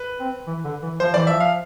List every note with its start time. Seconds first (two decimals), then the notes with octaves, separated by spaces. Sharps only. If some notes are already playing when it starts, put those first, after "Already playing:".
Already playing: B4
0.20 C4
0.47 E3
0.65 D3
0.83 E3
1.00 F3 C5
1.14 E3 D5
1.27 F3 E5
1.40 F5